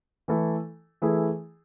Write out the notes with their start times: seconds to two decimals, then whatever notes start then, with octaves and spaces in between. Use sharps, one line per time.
0.28 E3 A3 E4 A4
1.02 E3 A3 E4 G#4